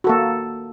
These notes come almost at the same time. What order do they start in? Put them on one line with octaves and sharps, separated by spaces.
F#4 A4 A#3